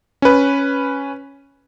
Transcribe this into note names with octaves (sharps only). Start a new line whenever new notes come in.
C#4 B4